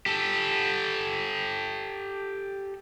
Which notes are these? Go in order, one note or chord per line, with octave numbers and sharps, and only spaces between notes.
G4 A4